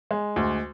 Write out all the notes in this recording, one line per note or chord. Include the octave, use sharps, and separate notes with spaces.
G#3
D2